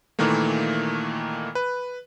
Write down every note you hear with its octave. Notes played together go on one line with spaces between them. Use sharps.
A#2 D#3 E3 A3 A#3
B4